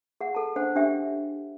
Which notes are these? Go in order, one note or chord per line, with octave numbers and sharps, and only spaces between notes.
G#4 F#5
A4 A5
D4 C5 F#5
D4 G4 E5 G5